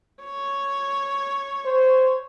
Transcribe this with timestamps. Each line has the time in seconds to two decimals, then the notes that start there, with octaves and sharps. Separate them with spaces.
0.24 C#5
1.65 C5